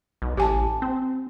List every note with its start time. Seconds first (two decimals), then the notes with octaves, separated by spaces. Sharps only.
0.22 B1
0.37 A1 G4 G#5 A5
0.82 C4